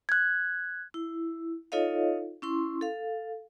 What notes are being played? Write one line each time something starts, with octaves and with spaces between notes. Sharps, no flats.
F#6 G#6
E4
D#4 F4 A4 C#5 D#5 F5
C#4 E4 C6
A4 F5